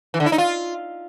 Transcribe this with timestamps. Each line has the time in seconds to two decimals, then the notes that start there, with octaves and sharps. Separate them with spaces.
0.14 E3
0.20 D3
0.26 E4
0.32 D#4
0.38 F4